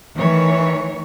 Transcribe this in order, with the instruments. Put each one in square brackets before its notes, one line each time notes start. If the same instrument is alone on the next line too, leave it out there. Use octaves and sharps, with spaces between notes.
[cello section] D#3 E3 A3 C#5